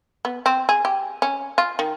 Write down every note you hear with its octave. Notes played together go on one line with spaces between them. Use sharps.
B3
C4
G#4
G4
C#4
F4
D#3